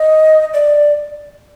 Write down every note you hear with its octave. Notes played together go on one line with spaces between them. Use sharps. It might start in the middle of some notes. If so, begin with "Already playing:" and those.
Already playing: D#5
D5